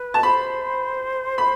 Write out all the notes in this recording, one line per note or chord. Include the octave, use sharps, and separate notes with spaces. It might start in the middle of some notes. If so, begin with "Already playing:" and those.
Already playing: B4
A5
C5 B5
B5